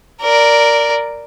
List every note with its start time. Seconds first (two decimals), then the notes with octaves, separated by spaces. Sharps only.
0.22 A#4 D5